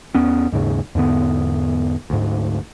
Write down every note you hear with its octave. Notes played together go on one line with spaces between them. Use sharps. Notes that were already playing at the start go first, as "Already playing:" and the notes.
E2 B3 C#4
D#2 G#2 C#3
E2 G#2 D3 B3
D2 G#2